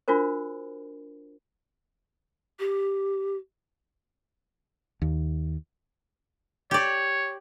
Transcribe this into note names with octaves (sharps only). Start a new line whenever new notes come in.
D4 F4 F#4 A#4 C5
G4
D#2
G4 C#5 D5